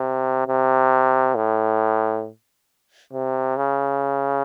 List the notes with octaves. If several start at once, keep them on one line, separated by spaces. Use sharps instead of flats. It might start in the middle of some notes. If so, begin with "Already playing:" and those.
Already playing: C3
C3
A2
C3
C#3